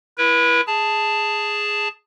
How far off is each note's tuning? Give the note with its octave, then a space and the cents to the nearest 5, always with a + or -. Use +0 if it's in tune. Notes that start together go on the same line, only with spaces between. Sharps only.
E4 +10 B4 -35
G#4 +0 A5 +0